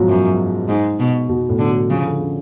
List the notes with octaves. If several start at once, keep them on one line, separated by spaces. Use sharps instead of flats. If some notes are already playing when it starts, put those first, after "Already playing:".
Already playing: G#2 B2 F3 F#3
F#2
G#2
B2
B2
A2
D3
F#3
C#3 F3
D3
C#3